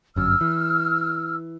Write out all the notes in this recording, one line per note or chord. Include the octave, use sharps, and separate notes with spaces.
G1 F#2 E6 F6
E3